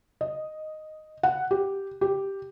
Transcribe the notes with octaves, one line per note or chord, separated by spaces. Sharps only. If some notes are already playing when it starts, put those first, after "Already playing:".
D#5
F#5
G4
G4